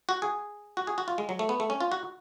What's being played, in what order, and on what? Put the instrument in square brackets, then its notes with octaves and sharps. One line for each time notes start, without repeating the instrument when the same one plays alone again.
[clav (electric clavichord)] F#4
G#4
F#4
G#4
F#4
F4
G#3
F#3
A3
B3
A3
C#4
F4
F#4